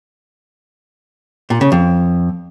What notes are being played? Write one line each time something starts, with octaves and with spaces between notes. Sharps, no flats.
A#2
C#3
F2